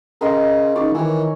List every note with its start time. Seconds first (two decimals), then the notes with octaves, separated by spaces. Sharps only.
0.21 C#3 A#4 D#5 C6
0.75 C#3 D#4 D5 C#6
0.94 D#3 E3 C#5 G#5